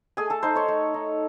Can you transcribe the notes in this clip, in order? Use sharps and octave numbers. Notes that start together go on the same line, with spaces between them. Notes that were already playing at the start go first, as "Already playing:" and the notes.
A3 G#4 G#5
A4 A5
D#4 C5 C6
C#5 C#6
A3
D#4